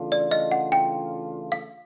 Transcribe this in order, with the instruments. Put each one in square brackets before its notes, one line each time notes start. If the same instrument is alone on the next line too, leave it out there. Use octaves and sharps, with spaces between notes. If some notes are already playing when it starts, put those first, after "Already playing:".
Already playing: [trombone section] C#3 E3 A3 D4 F4
[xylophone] D5
D#5
F#5
G5
F5